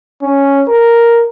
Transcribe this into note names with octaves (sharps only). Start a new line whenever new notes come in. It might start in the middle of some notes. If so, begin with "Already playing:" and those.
C#4
A#4